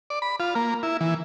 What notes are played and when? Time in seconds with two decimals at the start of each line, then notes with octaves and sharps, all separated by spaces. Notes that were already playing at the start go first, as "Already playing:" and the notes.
0.10 D5
0.22 B5
0.40 F4
0.55 A#3
0.83 E4
1.01 E3